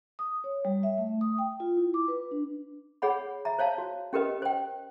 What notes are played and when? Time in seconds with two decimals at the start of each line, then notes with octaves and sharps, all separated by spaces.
0.19 D#6
0.44 C#5
0.65 G3
0.83 E5
0.98 A3
1.21 D#6
1.38 G5
1.60 F4
1.77 E4
1.94 D6
2.08 B4
2.31 D4
3.02 G#4 C#5 F#5 B5
3.45 E5 A#5
3.59 C5 C#5 F5 A5
3.78 F#4
4.13 C#4 G4 A#4 B4 D#5
4.42 C5 G5